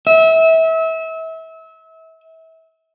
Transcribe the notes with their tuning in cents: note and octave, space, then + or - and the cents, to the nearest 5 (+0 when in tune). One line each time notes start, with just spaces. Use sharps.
E5 -30